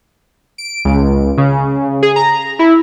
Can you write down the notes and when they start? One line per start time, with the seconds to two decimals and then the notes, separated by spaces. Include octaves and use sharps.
0.58 D7
0.85 C#2
1.38 C#3
2.03 G#4
2.16 A#5
2.59 E4